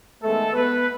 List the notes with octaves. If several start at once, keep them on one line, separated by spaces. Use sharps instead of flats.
D#3 G#3 A3 B3 A4
B3 B4